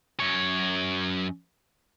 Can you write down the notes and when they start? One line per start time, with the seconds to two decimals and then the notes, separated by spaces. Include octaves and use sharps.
0.20 F#2 C#5